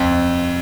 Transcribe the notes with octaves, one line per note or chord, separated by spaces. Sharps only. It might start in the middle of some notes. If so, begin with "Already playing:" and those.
Already playing: F2